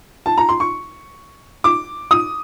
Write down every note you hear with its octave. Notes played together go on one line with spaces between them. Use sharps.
A5
A#5
C6
C#6
D6
D#6